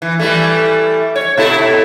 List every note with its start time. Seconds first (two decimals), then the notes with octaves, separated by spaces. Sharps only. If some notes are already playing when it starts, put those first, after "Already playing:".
0.02 E3
0.19 E3 G3 A3
1.16 C#5
1.37 B2 E4 A4